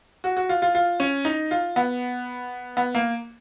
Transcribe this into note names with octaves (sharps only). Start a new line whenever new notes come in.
F#4
F#4
F4
F4
F4
C#4
D#4
F4
B3
B3
A#3